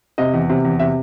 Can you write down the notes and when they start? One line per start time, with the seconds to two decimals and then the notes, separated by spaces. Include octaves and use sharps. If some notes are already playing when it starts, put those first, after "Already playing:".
0.18 C3 D#5
0.34 E2
0.49 C3
0.65 E2
0.80 C3 E5